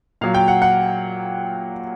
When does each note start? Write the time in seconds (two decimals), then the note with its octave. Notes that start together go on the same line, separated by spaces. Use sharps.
0.21 A#2 F#3 F5
0.34 G5
0.48 F#5
0.62 F#5